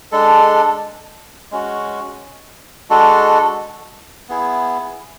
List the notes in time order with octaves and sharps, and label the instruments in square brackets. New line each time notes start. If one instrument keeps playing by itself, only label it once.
[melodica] G#3 D4 A4
G#3 C#4 F#4
G#3 D4 F#4 A4
B3 E4 G#4